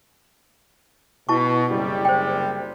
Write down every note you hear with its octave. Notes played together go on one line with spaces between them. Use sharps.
B2 E4 A5 C#6
F#1 C3 G3
C5 G5